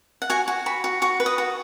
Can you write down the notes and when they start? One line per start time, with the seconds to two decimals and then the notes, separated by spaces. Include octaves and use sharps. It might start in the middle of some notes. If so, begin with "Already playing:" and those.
0.22 F#5
0.30 F#4 G#5
0.48 F#4
0.66 F#4 B5
0.84 F#4
1.02 F#4 C#6
1.20 B4
1.26 D#6
1.38 F#4